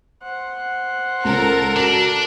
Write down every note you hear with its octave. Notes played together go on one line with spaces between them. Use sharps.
C5 F#5
C#2 C#3 A4 A#4
D4 F#4